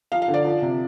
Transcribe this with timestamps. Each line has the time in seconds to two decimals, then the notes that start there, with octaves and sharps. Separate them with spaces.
0.12 F3 F5
0.22 F5
0.28 D3
0.34 D5
0.45 F3
0.62 C3